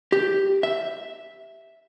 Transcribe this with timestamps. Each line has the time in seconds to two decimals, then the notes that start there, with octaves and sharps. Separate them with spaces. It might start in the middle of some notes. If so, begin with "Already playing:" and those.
0.12 G4
0.63 E5